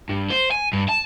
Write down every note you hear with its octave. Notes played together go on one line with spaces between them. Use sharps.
G2
C5
G#5
G2
A5